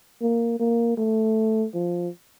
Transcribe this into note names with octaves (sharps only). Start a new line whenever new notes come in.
A#3
A#3
A3
F3